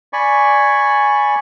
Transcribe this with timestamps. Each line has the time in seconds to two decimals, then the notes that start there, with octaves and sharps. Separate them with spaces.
0.13 D5 G#5 B5 C#6